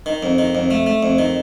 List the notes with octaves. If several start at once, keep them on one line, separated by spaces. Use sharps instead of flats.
D#3
F2
D#3
F2
A3
A3
F2
D#3